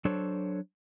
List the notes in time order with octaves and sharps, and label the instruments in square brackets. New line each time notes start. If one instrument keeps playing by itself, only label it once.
[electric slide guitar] F#3 D4 A4 C5 C#5